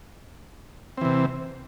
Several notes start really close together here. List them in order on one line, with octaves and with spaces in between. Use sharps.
C4 E3 C3